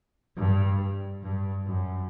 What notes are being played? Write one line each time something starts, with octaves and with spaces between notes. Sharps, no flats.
G2
G2
F#2